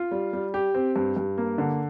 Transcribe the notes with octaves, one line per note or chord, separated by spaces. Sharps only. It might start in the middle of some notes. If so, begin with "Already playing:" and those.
Already playing: F4
G3
G3
G4
C4
G2
G2
A#3
D3